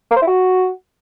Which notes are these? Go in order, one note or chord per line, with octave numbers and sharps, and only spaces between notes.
A#3
C5
E4
F#4